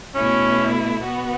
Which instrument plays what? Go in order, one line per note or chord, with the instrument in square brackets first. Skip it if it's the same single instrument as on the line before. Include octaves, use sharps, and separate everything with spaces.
[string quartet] B2 A3 E4 [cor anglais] C#4
[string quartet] B2 B3 F#4